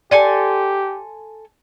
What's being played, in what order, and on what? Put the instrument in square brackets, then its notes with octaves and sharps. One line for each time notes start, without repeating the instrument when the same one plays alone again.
[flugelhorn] G4 [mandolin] A4 G#5 C6 [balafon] D5